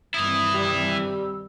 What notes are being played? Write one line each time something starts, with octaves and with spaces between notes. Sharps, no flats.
G2 C3 D#3 E3 E4 D#6
G3
E6